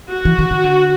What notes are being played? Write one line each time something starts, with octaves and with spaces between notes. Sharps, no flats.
F#4
E3
D#3
D#3
D3